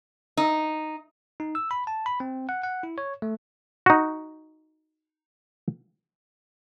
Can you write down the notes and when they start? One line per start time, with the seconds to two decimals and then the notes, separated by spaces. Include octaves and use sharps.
0.37 D#4
1.40 D#4
1.55 E6
1.71 B5
1.87 A5
2.06 B5
2.20 C4
2.49 F#5
2.63 F#5
2.83 E4
2.98 C#5
3.22 A3
3.86 D#4 F#4